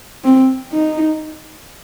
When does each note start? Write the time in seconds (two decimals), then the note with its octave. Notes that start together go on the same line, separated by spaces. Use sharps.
0.24 C4
0.73 D#4